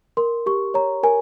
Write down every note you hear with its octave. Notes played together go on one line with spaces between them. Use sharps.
A#4 C6
G4 C#6
C#5 A#5
A#4 G#5